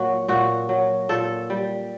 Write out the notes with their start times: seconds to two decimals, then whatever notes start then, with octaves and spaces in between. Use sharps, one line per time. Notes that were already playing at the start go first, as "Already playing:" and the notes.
Already playing: A#2 F#3 F#4
0.28 A#2 F#4
0.69 F#3
1.09 A#2 A4
1.50 G3